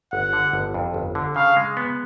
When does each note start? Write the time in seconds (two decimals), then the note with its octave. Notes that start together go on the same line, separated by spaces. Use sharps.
0.12 G1 F#5
0.33 D3
0.53 G1
0.74 F2
0.94 G1
1.15 D3
1.36 C#3 F5
1.56 G#3
1.77 B3